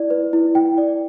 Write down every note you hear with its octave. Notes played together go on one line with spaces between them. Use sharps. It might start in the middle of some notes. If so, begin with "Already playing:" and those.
Already playing: E4 D5
B4
E4
E4 G5
D5